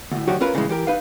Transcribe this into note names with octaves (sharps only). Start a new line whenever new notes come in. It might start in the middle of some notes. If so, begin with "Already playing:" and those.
D2 A2
D2 D#3 F#3 F#4 G4 C#5
C#4 F4 A#4 B4
A2 C#3 E3 F3 G#3
E3 G4 A#4
D#4 B4 F5